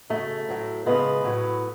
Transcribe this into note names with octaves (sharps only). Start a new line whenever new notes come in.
C#3 F#3 A3
A2 F#3
C#3 G#3 B3
A2 F#3